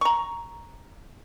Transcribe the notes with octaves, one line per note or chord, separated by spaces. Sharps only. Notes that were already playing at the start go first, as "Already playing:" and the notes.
A#5 C#6